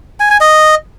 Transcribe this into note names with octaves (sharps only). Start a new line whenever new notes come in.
G#5
G#5
D#5